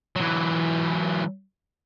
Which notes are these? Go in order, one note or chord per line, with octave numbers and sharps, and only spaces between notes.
E3 F#3